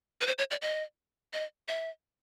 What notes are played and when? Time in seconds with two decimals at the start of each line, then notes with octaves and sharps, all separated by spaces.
0.21 B4
0.27 C5
0.38 C#5
0.51 D5
0.62 D#5
1.33 D#5
1.68 E5